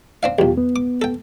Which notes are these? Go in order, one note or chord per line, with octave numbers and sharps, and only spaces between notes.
C4 D4 F5
B1 E2 F4 G4
B3
D6
A4 G5